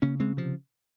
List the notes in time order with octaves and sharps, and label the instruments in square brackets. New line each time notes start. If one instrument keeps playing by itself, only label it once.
[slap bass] C#3 A#3 C#4
C#3 G#3 C4
C3 F3